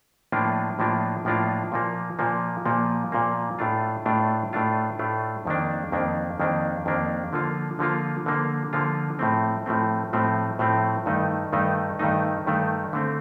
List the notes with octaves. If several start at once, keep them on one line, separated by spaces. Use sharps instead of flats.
A2 F3 A#3 D4 F4
A2 F3 A#3 D4 F4
A2 F3 A#3 D4 F4
A#2 F3 A#3
A#2 F3 A#3
A#2 F3 A#3
A#2 F3 A#3
A2 A3 D4 F4
A2 A3 D4 F4
A2 A3 D4 F4
A2 A3 D4 F4
F2 D#3 A#3 D4
F2 D#3 A#3 D4
F2 D#3 A#3 D4
F2 D#3 A#3 D4
D3 F3 A#3 F4
D3 F3 A#3 F4
D3 F3 A#3 F4
D3 F3 A#3 F4
A2 F3 A3 C4
A2 F3 A3 C4
A2 F3 A3 C4
A2 F3 A3 C4
G2 D#3 A3 D#4
G2 D#3 A3 D#4
G2 D#3 A3 D#4
G2 D#3 A3 D#4
D3 A3 C4